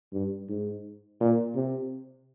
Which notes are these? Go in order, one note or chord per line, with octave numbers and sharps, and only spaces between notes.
G2
G#2
A#2
C3